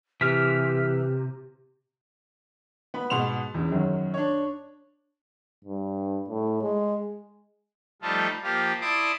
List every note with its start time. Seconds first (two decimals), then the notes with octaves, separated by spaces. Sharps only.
0.21 C3 E3 G4 F6 B6
2.94 B3 B5
3.10 G#2 B2 F#5 C6 F7
3.54 E2 C#3
3.71 F#2 D#3 F#3
4.14 D4 C#5
5.65 G2
6.29 A2
6.62 G#3
8.02 F3 G3 A3 D#4 F4 A4
8.43 F3 A#3 F4 G4
8.81 E4 D5 A5 C6 D6 D#6